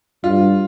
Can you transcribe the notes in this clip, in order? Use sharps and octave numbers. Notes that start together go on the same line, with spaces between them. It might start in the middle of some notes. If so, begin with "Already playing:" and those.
G2 F4